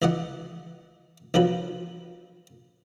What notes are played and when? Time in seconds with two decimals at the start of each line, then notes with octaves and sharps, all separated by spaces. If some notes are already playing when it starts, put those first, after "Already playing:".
0.02 C#2 E3 D5 D#5 F#5
1.34 B1 F3 F#3 B4